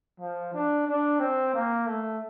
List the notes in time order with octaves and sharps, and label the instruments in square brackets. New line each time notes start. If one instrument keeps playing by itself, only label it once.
[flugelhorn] F3
D4
D4
C4
A#3
A3